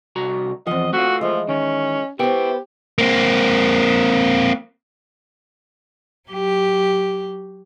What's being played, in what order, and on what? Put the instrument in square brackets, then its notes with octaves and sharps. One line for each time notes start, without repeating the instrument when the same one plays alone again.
[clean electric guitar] C2 F#4 A#5
[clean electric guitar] E2 F3 [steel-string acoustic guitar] C4 F#5 [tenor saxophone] D#5
[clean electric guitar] A3 F4 [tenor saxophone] F#4
[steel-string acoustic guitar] E3 G#3 [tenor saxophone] F3
[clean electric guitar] D#3 [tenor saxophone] C#4
[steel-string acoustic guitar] B3 C5 [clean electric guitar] E4 G5 [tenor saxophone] G4
[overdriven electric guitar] A#3 C4
[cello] F#3 G4